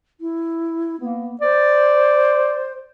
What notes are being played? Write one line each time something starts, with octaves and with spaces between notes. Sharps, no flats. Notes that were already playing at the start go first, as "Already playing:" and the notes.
E4
A#3 B3
C5 D5